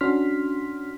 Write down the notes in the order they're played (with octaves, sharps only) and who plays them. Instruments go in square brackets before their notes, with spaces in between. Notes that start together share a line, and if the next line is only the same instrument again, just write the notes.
[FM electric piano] C#4 D4 F#4 C6 F6 B6